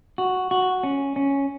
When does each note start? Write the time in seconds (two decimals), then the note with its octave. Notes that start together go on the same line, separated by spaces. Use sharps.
0.18 F#4
0.51 F#4
0.83 C#4
1.16 C#4